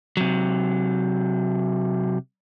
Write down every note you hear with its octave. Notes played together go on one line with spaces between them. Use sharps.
C3 F#3